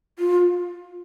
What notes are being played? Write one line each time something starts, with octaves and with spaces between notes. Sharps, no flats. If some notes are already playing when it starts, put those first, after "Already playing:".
F4